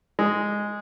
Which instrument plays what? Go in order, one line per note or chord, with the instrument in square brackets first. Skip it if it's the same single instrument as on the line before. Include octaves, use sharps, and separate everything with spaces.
[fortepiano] G#3